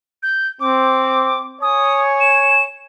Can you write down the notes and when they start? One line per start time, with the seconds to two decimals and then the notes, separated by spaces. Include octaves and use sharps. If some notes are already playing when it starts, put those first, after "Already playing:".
0.23 G6
0.60 C4 D6
1.62 C#5 G#5 D#6
2.21 E7